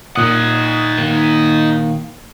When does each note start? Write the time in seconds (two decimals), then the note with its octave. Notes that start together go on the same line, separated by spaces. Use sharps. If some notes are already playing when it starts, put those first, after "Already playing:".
0.16 A#2 D#4 F#5 D#6
0.98 D#3 A#3